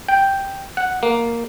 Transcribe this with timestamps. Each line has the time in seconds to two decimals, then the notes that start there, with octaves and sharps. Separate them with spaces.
0.08 G5
0.77 F#5
1.03 A#3